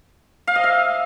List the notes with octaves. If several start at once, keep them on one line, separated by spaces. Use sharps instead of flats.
F5
D#5
E5